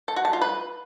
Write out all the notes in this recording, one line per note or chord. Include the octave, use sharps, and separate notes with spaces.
A4
F#4
A5
F4
B4